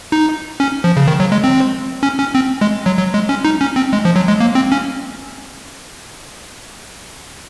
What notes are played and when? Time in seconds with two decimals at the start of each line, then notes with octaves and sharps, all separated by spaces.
0.12 D#4
0.60 C#4
0.84 F3
0.97 C#3
1.07 D#3
1.20 F#3
1.32 G#3
1.44 C4
2.03 C#4
2.19 C#4
2.35 C4
2.61 G#3
2.86 F#3
2.98 F#3
3.14 G#3
3.29 C#4
3.45 D#4
3.61 C#4
3.76 C4
3.93 G#3
4.05 F3
4.16 F#3
4.28 G#3
4.41 A#3
4.55 C4
4.72 C#4